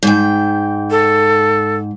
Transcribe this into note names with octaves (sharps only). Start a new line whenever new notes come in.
G#2 G5
A4